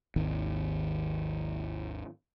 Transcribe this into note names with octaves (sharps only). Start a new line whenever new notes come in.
G#1 D#2 D#3